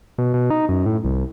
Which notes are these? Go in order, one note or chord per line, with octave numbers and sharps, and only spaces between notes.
B2
B2
D#4
F#2
A2
C2